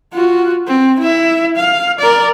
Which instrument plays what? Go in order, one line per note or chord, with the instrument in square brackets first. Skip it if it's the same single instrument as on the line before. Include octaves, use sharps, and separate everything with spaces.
[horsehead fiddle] F4 F#4
C4
E4 E5
F5
A#4 D5